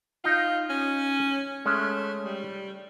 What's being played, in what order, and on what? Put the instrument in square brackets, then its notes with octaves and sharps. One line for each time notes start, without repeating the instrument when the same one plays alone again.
[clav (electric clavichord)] D#4 F5 [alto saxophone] F4
[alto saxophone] C#4
[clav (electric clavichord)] G#3 C#4 [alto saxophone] A3
[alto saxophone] G3